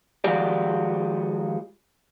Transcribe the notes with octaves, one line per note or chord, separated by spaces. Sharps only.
D#3 F3 G#3 F#4 G4 D5